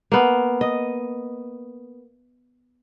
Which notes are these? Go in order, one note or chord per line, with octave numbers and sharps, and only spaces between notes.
A#3 B3
D#5